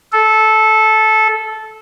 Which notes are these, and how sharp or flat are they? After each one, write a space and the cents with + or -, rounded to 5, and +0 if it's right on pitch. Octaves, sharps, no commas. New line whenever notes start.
A4 -15